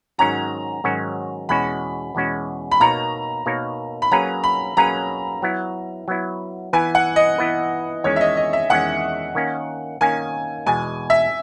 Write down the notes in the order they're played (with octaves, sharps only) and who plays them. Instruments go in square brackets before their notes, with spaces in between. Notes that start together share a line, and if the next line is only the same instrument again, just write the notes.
[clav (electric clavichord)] G#2 D#3 F#3 C#4 F#4 [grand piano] A#5
[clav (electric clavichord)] G#2 D#3 F#3 C#4 F#4
[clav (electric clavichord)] E2 B2 G#3 C#4 F#4 [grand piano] B5
[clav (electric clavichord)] E2 B2 G#3 C#4 F#4
[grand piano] B5
[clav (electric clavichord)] B2 A#3 D#4 A#4 C#5 [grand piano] A#5
[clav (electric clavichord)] B2 A#3 D#4 A#4 C#5
[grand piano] B5
[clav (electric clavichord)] F#3 A#3 C#4 G#4 B4 [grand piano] A#5
[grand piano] B5
[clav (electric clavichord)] F#3 A#3 C#4 G#4 B4 [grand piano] A#5
[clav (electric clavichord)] F#3 B3 E4
F#3 B3 E4
[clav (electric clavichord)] E3 B3 E4 B4 [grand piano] G#5
[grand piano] F#5
D#5
[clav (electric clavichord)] E3 B3 E4 B4
[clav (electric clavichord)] E2 D#3 G#3 C#4 [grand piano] C#5
[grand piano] E5
D#5
D#5
E5
[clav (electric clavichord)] E2 D#3 G#3 C#4 [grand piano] F#5
[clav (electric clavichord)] D#3 A#3 C#4
[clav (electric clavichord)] D#3 A#3 C#4 [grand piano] G#5
[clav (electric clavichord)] E2 B2 G#3 [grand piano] G#5
[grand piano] E5